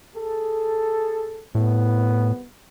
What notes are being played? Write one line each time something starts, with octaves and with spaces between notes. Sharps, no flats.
G#4 A4
C2 A2 B3